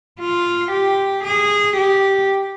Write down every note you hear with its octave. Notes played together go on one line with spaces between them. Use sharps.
F4
G4
G#4
G4